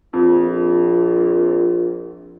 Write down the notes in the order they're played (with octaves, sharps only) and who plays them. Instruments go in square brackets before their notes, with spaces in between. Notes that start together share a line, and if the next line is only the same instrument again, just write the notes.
[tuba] A#1 [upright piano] F2 [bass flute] F4